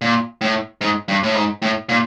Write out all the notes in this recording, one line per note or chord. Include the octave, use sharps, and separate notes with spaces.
A#2
A2
G#2
G2
A2
G#2
A2
A#2